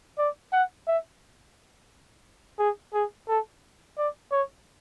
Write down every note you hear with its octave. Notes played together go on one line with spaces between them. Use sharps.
D5
F#5
E5
G#4
G#4
A4
D5
C#5